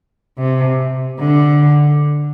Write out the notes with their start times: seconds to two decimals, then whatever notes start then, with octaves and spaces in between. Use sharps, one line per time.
0.39 C3
1.19 D3